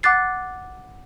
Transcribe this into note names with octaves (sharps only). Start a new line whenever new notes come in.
F#5 D6 F#6 A6 C7